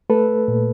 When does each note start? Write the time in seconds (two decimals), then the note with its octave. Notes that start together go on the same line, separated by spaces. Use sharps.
0.10 A3 A4 B4
0.48 A#2